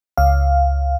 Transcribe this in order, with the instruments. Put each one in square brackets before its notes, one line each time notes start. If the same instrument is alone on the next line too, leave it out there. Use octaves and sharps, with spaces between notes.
[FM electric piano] C#2 F5